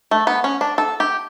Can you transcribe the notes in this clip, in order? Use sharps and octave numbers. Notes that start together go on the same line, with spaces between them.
A3
B3
C#4
D4
A4
G4